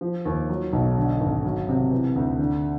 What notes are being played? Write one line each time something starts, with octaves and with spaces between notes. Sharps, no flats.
F3
D#2
F#3
B1
D3
G#1
F#3
C3
E3
D2
D3